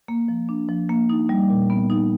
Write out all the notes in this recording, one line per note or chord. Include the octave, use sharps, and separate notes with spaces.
A#3
F3
D4
F3
A#3
D#4
G3
A#2
B3
D#4